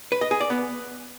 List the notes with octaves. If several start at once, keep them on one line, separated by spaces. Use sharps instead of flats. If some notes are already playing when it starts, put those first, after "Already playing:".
B4
D#5
G#4
D5
B3